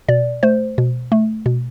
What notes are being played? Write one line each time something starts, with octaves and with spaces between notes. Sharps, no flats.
B2 D5
A3 C5
B2
A3
B2